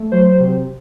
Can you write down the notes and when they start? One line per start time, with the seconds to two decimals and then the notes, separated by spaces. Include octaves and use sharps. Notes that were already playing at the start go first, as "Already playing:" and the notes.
Already playing: A3
0.12 F#3 C5
0.40 C3